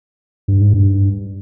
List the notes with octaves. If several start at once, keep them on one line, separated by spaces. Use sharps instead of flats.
G2
G#2
G2